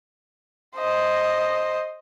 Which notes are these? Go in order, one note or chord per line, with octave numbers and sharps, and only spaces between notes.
C5 D#5